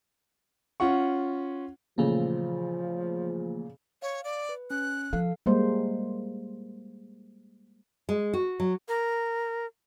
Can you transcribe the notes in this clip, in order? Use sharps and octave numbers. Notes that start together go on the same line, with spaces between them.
C#4 F4 F#5 C#6
A#2 C#3 E3 F3 A3 A#3
C#5 F5
D5
B4
C#4 F#6
F3 A4 F5
G3 G#3 A#3 C5
G#3
F#4
F#3
A#4